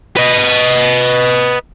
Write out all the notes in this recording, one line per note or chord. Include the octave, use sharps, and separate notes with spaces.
B4 D#5